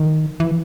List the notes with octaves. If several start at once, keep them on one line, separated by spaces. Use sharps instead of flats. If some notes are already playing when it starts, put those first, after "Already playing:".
Already playing: D#3
E3